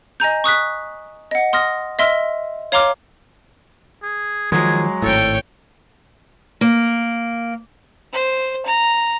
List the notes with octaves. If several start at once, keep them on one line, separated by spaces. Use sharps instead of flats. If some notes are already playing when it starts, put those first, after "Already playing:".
D#5 G#5 A#5 G6
C#6 D#6 F#6 B6
D#5 F#5
C6 D#6 F6 A#6
D#5 E5 C6 E6 F6
C#5 F5 A#5 C6 D6 F6
G#4
D#3 F3 F#3 G#3 G#4
G#1 A2 A4 C#5 G5
A#3
C5
A#5